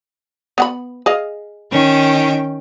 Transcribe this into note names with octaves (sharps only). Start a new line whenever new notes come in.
B3 F#5 B5
G#4 D#5 F5
D#3 C#4 G5